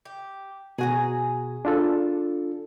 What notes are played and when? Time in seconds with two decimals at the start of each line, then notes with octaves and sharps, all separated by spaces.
0.05 G4
0.78 B2 F#4 G#4 G#5 A#5
1.65 D4 F4 A4